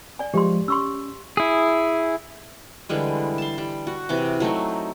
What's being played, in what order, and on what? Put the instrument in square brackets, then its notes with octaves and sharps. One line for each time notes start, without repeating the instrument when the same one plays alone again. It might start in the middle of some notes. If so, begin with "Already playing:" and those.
[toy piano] D5 G#5
[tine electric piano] F3 G#3 [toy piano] G4 C6
[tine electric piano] C#4 [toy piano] C6 C#6 E6
[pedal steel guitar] E4 G#4
[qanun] D3 E3 G3 G#3
A5 C6
G3
F#4
C3 E3 D6
F#3 A3 C4 D#4